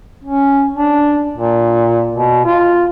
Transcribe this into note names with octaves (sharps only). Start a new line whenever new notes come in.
C#4
D4
A#2
B2
F4